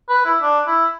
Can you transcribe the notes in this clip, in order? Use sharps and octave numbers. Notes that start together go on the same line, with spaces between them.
B4
E4
D4
E4